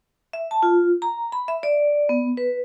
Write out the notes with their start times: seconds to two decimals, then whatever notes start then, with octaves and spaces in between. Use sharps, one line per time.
0.33 E5
0.51 A5
0.63 F4
1.02 A#5
1.32 B5
1.48 E5
1.63 D5
2.09 B3
2.37 B4